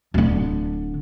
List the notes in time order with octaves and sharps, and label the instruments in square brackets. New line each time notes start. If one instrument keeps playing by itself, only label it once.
[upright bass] D1 D3